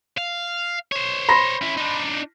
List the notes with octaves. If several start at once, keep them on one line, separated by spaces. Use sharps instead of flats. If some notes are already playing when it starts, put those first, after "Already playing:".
F5
C5 C#5
B5 C6 A#6
C#4 E4
D4 D#4